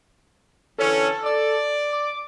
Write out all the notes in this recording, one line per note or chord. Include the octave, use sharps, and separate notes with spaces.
D3 E3 C#4 A4
D5
D6